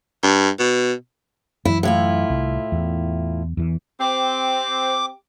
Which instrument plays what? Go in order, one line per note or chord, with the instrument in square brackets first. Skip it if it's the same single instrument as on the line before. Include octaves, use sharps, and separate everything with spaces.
[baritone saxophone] G2
B2
[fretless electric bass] F#2 E3 [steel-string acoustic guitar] E4
[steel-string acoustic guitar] A2 E4 F4
[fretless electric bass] C2
E2
E2 E3
[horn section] C4 [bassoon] G4 [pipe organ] D6